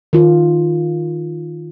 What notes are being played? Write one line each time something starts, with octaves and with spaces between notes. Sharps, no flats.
D#3 F4